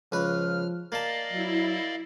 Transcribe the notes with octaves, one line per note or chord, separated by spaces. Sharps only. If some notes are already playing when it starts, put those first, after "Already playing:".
C#2 F3 B4 F6
A#3 D5 D#5 F5 A5
F#3 E4